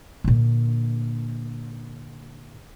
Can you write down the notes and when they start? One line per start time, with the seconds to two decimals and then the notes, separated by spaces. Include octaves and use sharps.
0.24 A#2 D3